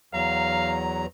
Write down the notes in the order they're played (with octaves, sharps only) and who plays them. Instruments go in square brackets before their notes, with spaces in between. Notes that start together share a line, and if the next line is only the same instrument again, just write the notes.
[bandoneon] E2 F#3 A#5 [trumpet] F5